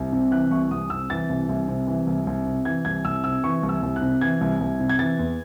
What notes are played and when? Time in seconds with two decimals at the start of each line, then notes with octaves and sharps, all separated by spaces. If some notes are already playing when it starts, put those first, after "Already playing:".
Already playing: C2
0.12 C3
0.31 E3 F#6
0.51 C2 C#6
0.70 C2 D#6
0.90 C3 E6
1.10 E3 A6
1.29 C2
1.49 C2
1.68 C3
1.87 E3
2.07 C2
2.27 C2
2.46 C3
2.65 E3 G#6
2.85 C2 G#6
3.05 C2 E6
3.24 C3 E6
3.43 E3 C#6
3.63 C2
3.69 E6
3.82 C2
3.96 F#6
4.02 C3
4.21 E3 G#6
4.41 C2
4.60 C2
4.80 C3
4.89 G#6
4.99 E3 A6
5.19 E2